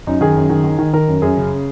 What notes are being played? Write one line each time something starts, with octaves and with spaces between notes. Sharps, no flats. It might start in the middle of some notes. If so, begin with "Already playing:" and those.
F#2 D#4
D#3 G#4
F#2
D#3
D#3
D#3
D#3 A#4
F#2
F#2 G#4
C#3